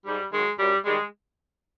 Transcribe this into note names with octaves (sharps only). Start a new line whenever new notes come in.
G#2 G3
D#3 F#3 G#3
F#2 G3
D#3 G3 G#3